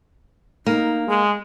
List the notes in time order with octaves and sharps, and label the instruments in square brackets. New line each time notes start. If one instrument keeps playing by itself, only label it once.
[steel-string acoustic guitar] A#3 [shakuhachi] D#4
[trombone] G#3 [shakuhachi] G#4